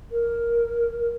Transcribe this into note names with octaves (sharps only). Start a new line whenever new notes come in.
A#4